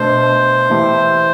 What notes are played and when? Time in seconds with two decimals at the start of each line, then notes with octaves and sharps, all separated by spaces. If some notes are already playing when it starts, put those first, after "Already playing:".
Already playing: B2 A3 D4 C5
0.70 E3 A3 E4 G4